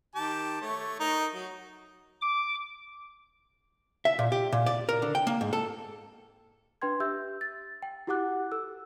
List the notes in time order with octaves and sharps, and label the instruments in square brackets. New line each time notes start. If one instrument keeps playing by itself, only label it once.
[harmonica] D#3 G4 A5
A3 C#5
D#4 A#4
F#3
[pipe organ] D6
[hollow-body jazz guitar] E5
A#2
G4
A#2
D5
A#4
D3
G5
A#3
G#2
A4
[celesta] D4 B4 G5 C6 G#6
G4 E5 E6 G6
A6
G5
E4 F#4 G4 F#5 D6 F#6
A4 E6